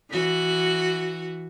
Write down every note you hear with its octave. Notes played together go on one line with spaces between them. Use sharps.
E3 F#4